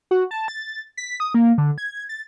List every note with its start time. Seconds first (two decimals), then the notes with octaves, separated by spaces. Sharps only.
0.11 F#4
0.31 A5
0.48 A6
0.97 B6
1.20 D#6
1.34 A#3
1.58 D3
1.78 G#6
2.09 A6